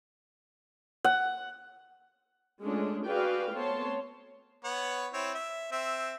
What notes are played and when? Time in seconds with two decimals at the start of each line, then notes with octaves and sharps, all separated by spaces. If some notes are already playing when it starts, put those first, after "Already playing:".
1.04 F#5
2.61 G#3 A3 C#4 D4 F4 A4
3.07 F#4 G#4 B4 D5 F5 G5
3.52 A3 B3 C4 C#5 A5 C6
4.64 B3 C#5 F#5
5.13 C4 E4 C#5
5.34 E5
5.72 C4 E5